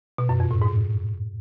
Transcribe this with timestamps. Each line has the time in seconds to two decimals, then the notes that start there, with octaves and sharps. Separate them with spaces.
0.18 B2
0.29 F#2
0.40 F2
0.51 A2
0.62 G#2